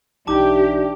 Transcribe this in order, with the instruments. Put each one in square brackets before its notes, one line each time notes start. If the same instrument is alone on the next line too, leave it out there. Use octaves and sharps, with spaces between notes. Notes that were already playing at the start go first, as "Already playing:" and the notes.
[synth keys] B1 D#4 G6 [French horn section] E3 D4 [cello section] G4 [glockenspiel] A5 D6